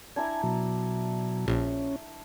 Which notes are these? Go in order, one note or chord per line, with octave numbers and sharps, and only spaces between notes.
D4 E4 G#5 A#5
B2 F#3
A#1 C#4